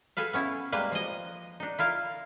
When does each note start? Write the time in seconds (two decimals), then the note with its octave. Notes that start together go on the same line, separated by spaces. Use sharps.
0.17 G#4 A4 B4 F5
0.33 B3 C#4 E4
0.72 G3 G#3 A#3 B4
0.92 F3 D#5
1.60 D4 D#4
1.79 E4 F4 A#4 F5